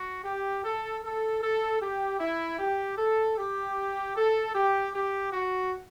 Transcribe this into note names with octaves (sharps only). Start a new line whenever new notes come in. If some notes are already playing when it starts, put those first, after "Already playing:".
Already playing: F#4
G4
A4
A4
A4
G4
E4
G4
A4
G4
A4
G4
G4
F#4